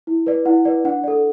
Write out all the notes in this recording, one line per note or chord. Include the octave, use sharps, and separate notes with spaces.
E4
B4 D5
E4 F#5
B4 D5
D4 F#5
A4 D5